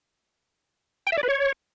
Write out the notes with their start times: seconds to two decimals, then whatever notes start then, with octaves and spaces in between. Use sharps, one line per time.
1.07 G5
1.12 E5
1.18 D5
1.23 B4
1.29 C#5